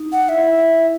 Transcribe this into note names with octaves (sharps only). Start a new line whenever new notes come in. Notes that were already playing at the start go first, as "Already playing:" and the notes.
Already playing: D#4
F#5
E4 E5